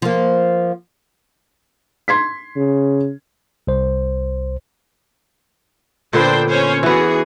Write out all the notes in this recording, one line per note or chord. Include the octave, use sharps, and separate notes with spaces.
F3 A#3
C6 G#6 B6
C#3
C2 C5
A#2 D3 B3 D4 C5 G5
C#4 C5 C#5
E3 B3 F#4 G#4